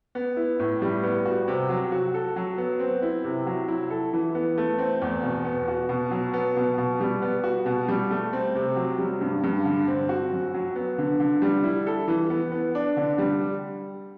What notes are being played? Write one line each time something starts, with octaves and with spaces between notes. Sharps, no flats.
B3
E4
A2
G3
B3
F#4
C3
F#3
F#4
A4
F#3
B3
C4
E4
C3
F#3
E4
A4
E3
B3
A3
C4
E2
B2
B3
F#4
B2
F#3
B3
B2
B2
G3
B3
F#4
B2
G3
A3
C4
C3
F#3
G3
G2
G2
D3
C4
F#4
F#2
F#3
B3
D3
D3
G3
E4
A4
E3
B3
B3
D4
D3
G3